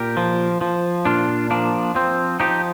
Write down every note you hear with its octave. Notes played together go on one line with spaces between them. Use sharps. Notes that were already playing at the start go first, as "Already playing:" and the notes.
Already playing: A#2 G4 A#4
F3
F3
A#2 D4 F4
F3 A#3 D4
F3 C4
F3 D#4 G4